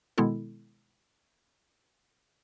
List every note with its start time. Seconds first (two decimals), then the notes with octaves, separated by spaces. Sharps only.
0.18 B2 D#3 G#3 B3 E4 A4